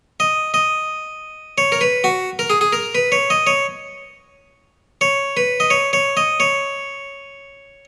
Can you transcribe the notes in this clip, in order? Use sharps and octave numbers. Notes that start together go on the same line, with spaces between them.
D#5
D#5
C#5
A#4
B4
F#4
A#4
G#4
G#4
A#4
B4
C#5
D#5
C#5
C#5
B4
D#5
C#5
C#5
D#5
C#5